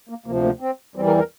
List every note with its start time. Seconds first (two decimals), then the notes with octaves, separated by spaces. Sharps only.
0.09 A#3
0.26 D2 C3 F3 A#3
0.44 A#3
0.60 C4
0.95 E2 E3 G3 C4
1.07 A#4
1.18 A#4